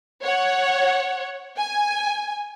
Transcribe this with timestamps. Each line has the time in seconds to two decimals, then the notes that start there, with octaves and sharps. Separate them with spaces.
0.23 C#5 F#5
1.58 G#5